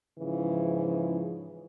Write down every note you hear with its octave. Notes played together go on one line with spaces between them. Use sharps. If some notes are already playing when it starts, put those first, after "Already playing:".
G#2 C#3 E3 F3